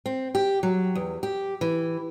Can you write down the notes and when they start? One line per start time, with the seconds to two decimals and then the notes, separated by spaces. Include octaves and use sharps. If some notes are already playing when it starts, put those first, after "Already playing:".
0.06 C4
0.35 G4
0.63 F#3
0.95 E2
1.23 G4
1.61 E3